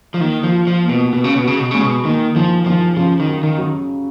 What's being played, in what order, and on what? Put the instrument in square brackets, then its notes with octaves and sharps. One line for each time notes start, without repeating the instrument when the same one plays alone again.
[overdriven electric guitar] F3
[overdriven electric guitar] D#3 [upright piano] A#3
[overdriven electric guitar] F3
[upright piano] F4
[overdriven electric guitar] F3
[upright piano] A#3
[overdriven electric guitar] B2
[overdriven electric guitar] B2 [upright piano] F#4
[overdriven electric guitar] C#3
B2
[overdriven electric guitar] C#3 [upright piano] F#4
[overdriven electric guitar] B2
[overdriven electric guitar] C#3 [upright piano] G#3
[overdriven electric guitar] B2
[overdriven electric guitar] D#3 [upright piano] A#3
[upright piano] D#3 [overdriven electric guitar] F3
[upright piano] D#3 [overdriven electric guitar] F3
[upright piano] C#3 [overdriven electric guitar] F3
[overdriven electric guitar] D#3
[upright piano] F#3
[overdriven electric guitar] D#3
[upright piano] F#3